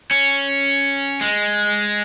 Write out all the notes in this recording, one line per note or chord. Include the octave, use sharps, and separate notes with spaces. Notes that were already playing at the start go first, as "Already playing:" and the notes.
C#4
G#3